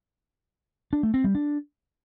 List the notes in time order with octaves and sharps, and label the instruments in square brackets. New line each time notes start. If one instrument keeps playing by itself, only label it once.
[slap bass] D4
A3
C4
G3
D4